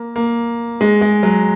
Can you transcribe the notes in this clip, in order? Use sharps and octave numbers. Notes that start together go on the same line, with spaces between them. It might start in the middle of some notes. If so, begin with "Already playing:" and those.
Already playing: A#3
A#3
G#3
G#3
F#3